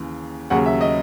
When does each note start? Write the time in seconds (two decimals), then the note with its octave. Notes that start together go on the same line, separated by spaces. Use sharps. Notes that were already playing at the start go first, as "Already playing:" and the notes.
Already playing: D#2 C#3 E3
0.50 D#2 C#3 F#3 F#5
0.66 E5
0.81 D#5